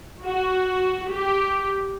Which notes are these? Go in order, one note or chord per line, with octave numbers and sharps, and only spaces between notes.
F#4
G4